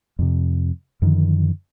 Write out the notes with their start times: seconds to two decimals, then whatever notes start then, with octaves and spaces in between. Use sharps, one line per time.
0.19 F2 C3
1.02 F#2 D3 D#3 F3